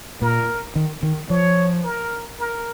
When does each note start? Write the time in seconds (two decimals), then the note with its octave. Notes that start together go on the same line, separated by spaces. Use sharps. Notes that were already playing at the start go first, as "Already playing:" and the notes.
0.22 A#2 A#4
0.76 D#3
1.03 D#3
1.30 F3 C#5
1.84 A#4
2.39 A#4